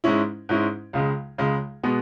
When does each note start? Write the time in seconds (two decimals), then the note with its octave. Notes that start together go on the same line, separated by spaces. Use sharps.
0.04 G#2 G#3 C#4 E4
0.49 G#2 G#3 C#4 E4
0.93 C#2 C#3 G#3
1.38 C#2 C#3 G#3
1.83 B2 G#3 B3